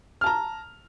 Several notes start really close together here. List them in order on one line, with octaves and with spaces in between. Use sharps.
F6 A5 A#5